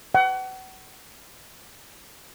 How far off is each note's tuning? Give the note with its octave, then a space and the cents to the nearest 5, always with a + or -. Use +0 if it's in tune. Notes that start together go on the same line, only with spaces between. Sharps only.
F#5 +35